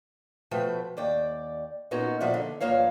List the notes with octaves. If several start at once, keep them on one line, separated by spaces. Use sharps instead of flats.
B2 F3 A3 B4 G5
D#2 D5 G5
A#2 B3 C#4 D#4 F#4
A#2 F3 B3 D5 E5 F#5
D3
G2 F3 A#3 C#5 F5